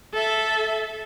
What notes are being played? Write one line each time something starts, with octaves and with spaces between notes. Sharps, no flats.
A4 E5